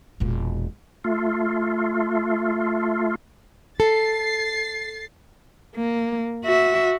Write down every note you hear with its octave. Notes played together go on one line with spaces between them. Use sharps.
E1 A#2
A3 F4
A4 A6 C7
A#3
F#4 E5